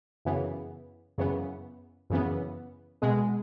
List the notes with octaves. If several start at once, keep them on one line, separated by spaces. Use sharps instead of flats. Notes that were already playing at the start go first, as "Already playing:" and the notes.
F#2 C#3 E3 B3
F#2 C#3 E3 B3
F#2 C#3 E3 B3
B2 G#3 B3 G#4